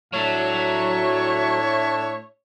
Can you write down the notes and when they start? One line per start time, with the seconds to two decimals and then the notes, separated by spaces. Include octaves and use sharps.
0.14 A2 F#3 D4 C#5 E5 A5